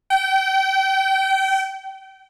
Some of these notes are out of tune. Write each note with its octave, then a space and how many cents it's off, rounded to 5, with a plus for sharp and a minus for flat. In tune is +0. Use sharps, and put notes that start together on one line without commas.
G5 -30